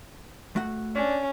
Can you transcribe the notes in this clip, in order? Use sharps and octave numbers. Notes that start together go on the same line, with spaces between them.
A3 F#4 F#5
C#4 D4